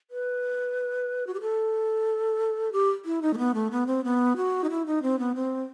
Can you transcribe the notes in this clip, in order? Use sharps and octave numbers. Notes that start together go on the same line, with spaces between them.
B4
F#4
G4
A4
G4
E4
D#4
A3
B3
A3
B3
C4
B3
F#4
D#4
E4
D#4
C4
B3
C4